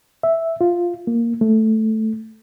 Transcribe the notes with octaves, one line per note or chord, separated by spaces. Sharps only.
E5
F4
A#3
A3